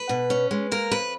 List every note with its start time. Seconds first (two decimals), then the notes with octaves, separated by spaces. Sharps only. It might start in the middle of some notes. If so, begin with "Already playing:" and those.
Already playing: B4
0.09 B2
0.30 C#4
0.51 G#3
0.72 A#3 A#4
0.91 F2 B4